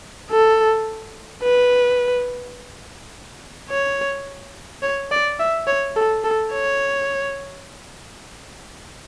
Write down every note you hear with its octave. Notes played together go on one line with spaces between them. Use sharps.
A4
B4
C#5
C#5
D5
E5
C#5
A4
A4
C#5